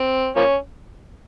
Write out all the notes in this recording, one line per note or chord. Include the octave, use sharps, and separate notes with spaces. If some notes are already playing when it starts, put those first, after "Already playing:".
Already playing: C4
F3 A#3 C#4